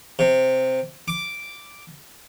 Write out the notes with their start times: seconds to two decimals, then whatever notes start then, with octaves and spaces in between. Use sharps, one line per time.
0.19 C3
1.08 D6